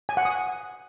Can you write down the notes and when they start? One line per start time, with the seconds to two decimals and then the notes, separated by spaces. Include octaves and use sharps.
0.09 G#5
0.17 F#5
0.25 D#6